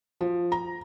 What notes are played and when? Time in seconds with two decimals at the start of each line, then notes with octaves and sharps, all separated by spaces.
0.21 F3
0.52 A#5